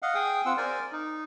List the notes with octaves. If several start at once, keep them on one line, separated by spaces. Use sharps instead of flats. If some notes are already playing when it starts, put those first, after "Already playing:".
D#5 F5 F#5
G#4 G5 D#6
C4 F4 F#5 E6
A#4 C5 D5 G#5
D#4